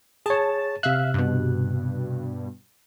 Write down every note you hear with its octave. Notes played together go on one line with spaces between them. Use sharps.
G#4 C#5 A5
C3 E5 F5 F#6
G2 B2